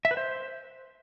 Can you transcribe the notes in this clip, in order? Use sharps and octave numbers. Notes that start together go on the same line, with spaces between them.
E5
B4
C5